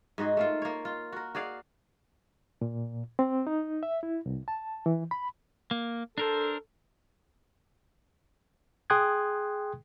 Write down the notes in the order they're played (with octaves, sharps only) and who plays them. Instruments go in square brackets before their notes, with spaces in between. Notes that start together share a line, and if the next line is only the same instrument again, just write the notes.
[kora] G#2 D#4 F#4 G#4
A3 A#3 F4
A#3 C#5
F4
F#4 A#4
F#4 G#4 D5 F5
[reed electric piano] A#2
C4
D#4
E5
E4
C2
A5
E3
B5
[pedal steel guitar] A#3
[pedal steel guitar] D4 A#4 C5 [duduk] A4
[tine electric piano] G#4 G5 C6 D#6 F#6 G#6